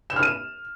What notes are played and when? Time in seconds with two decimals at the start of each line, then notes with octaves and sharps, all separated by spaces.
0.10 E7
0.16 F6
0.23 D#7